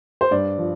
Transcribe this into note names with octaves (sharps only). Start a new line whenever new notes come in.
C5
G2 D5
F3